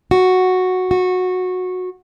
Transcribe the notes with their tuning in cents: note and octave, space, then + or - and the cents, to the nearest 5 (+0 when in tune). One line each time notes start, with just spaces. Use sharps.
F#4 -5
F#4 -15